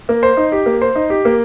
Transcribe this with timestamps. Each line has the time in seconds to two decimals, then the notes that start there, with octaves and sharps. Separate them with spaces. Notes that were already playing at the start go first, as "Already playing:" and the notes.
0.09 A#3
0.23 C5
0.37 D#4
0.52 G4
0.66 A#3
0.82 C5
0.95 D#4
1.10 G4
1.25 A#3